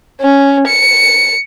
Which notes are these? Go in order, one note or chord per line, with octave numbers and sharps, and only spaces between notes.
C#4
C#7